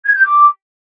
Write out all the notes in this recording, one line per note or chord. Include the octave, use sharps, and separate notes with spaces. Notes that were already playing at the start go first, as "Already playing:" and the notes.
G#6
G6
D6